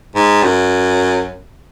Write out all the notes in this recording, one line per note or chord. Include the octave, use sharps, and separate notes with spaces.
G#2
F#2